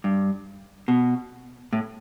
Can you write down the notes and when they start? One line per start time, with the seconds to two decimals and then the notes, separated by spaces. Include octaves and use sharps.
0.04 G2
0.88 B2
1.73 A2